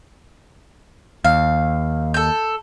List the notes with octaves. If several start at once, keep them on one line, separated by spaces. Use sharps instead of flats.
D#2 F5
A4 G6